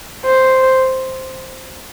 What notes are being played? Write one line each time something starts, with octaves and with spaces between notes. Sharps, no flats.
C5